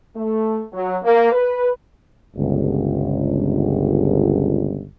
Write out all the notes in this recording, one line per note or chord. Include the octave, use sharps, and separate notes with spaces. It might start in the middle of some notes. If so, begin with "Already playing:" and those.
A3
F#3
A#3
B4
G1 C#2